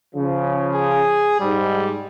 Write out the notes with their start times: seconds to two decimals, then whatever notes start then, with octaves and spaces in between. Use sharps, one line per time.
0.15 C#3 F3
0.75 G#4
1.40 G#2 G3